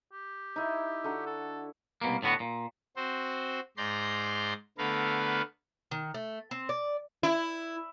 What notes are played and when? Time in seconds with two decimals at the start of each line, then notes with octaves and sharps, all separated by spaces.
0.13 G4
0.56 D#4 E4 E5
1.04 D3 F#4 A#5
1.26 A4
2.01 C2 B2 A#3
2.23 A2 D3 B3 F#4
2.40 A#2
2.96 C4 F#4 C5
3.77 G#2 D5 A#5 C6 G6
4.78 D3 A3 B3 A#4 B4 F5
5.91 D#3
6.14 A3
6.51 C4
6.69 D5
7.23 E4